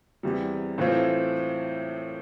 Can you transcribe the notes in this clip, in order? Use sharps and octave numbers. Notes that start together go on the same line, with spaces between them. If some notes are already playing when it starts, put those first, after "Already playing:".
E2 C3 G3
A2 E3 A3 C4 F4